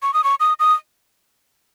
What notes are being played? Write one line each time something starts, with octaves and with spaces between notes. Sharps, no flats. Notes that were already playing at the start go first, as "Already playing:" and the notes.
C#6
D#6
C#6
D#6
D#6